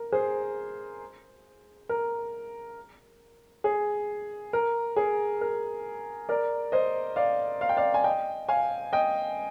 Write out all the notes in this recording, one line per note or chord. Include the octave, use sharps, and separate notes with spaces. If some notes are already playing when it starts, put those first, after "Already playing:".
Already playing: A#4
G#4 C5
A#4
G#4
A#4
G#4
A#4
A#4 D5
C5 D#5
D5 F5
F5
G5
D5 F5
G#5
D#5 G5
F5 G#5
D#5 G5